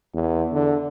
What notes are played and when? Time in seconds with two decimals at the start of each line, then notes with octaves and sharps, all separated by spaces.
0.14 E2
0.53 D3